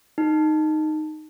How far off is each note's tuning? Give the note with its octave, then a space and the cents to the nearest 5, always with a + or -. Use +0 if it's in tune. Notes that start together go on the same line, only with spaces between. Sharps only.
D#4 -5